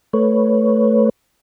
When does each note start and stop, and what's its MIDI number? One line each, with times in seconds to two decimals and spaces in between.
0.13 1.09 57
0.13 1.09 71
0.13 1.09 73